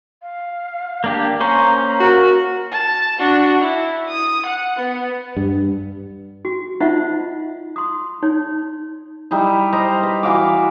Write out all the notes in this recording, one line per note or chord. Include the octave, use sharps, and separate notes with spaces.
F5
A#3 D4 G4
A#3 C#4 C5 A#5
F#4 A#4
A5
D4 F#4
E4
D#6
F#5
B3
G2
F#4
D#4 F4 C5 D#5 E5 F#5
C6 D#6
D#4 C#5
G3 D#4 E4
C5 D#5 A#5
B4
E3 F#4 F5 D6